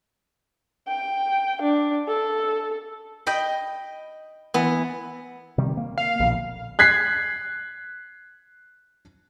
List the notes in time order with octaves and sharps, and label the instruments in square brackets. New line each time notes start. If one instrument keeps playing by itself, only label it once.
[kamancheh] G5
D4
A4
[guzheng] D#5 G5 B5
E3 B3
[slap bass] C3 D#3 G3
A#3
[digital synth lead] F5
[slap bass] A#1 B2 D3
[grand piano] F#6 G#6 B6 C7